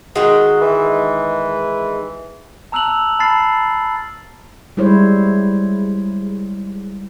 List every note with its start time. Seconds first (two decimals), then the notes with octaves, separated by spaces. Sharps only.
0.16 D#3 G#3 F#4
0.61 E3
2.72 A5 A#5 E6 F#6 F7 F#7
3.19 A5 B5 F6 A6 C7
4.77 G3 G#3 E4 C5 C#5